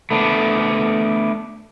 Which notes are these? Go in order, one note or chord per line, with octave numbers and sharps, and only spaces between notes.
A3 B3 D4